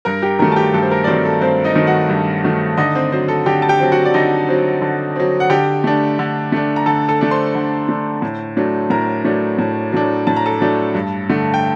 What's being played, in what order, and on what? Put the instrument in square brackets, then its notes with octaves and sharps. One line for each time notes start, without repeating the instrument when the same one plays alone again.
[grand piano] G2 A#4 A#5
G4 G5
D#3 F#3 A3 A#4 A#5
A5
G4 G5
G2 A4
C5
A#4
D5
D#3 F#3 A3 C4 C5
A4
G2 C4 C5
D#4 D#5
D#3 F#3 A3
F#4 F#5
G2
D#3 F#3 A3
D3 D#4 D#5
C4 C5
F#3 C4 C5
A4
D3 G4 G5
A5
G4 G5
F#3 C4
F#4 F#5
D5
D3 D#4 D#5
F#3 C4
D3
F#3 C4
F#5
D3 G4 G5
A3 D4
D3
A3 D4
A#5
D3 A4 A5
A4 A5
A3 D4
C5 C6
D3
A3 D4
A2
F#3 A3 D4
A2 A#4 A#5
F#3 A3 D4
A2
F#3 A3 D4
A2 A5
A#5
A4 A5
F#3 A3 D4
G2
D3 A3
G5